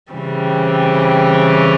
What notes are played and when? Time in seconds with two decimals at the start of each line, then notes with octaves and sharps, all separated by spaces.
0.12 C#3 E3 G3 C4